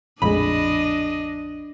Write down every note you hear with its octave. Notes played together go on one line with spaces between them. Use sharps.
A#1 F2 A2 G#3 D4 D#5 B5